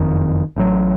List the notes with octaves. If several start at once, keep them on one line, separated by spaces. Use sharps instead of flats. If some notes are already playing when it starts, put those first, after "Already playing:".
Already playing: F#1 F2 D#3
A1 A2 F#3